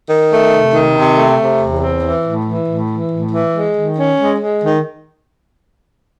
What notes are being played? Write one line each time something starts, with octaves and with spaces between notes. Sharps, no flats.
D#3
A3
C3
D#3
C3
A3
C3
E2
C4
E3
A2
E3
A2
E3
A2
E3
G#3
D#3
C#4
G#3
G#3
D#3